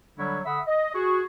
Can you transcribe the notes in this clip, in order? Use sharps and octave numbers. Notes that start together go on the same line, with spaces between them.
D3 F#3 G3 D4 E4 C#5
D3 E5 F#5 B5 D#6
D#5
F#4 G#4